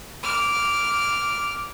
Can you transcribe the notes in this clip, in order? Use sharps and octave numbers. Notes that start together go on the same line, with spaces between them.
D6 F6